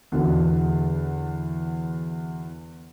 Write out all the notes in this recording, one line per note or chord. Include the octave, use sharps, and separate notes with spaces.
E2 B2 D3